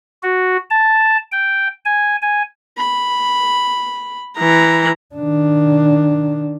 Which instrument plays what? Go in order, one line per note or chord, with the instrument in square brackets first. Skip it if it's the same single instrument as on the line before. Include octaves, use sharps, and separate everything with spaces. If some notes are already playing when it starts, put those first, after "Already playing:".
[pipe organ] F#4
A5
G5
G#5
G#5
[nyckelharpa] B5
[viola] E3 A#5
[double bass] D#3 D4